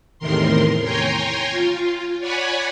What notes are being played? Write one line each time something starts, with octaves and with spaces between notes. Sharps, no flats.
E2 A2 C3 D#3 A#4 C6
C#5 G5 G#5 A#5 C6
F4
C#5 D5 F#5 G#5 B5